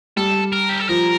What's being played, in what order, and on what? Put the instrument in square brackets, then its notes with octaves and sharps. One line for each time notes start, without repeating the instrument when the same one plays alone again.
[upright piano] G3 [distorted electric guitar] A4
[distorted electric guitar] A#4
G4
A4
[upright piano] F3 [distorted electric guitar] A#4